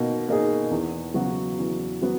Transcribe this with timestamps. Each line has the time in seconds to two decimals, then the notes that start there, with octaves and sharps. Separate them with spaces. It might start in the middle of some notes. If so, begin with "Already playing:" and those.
Already playing: B2 A#3 D#4
0.28 A#3 D#4 G#4
0.71 E2
1.14 C#3 F#3 B3 F#4
1.59 E2
2.02 F#3 B3 F#4